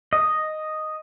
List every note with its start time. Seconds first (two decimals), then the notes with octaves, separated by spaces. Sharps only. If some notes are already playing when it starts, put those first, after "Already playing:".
0.13 D#5